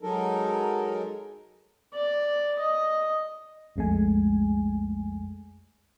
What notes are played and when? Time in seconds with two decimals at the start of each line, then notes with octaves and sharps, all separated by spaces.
0.02 F#3 G#3 D#4 A4 A#4
1.94 D5
2.60 D#5
3.76 B1 F2 G#3 A3 G#5